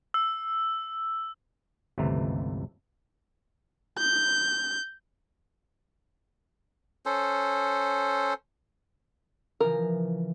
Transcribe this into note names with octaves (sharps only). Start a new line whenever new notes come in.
E6
G1 C#2 C3 E3 A3 A#5
G6
C#4 A4 C5
C#3 E3 F3 A#4